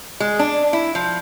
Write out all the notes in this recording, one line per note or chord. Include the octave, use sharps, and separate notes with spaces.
G#3
D4
E4
F3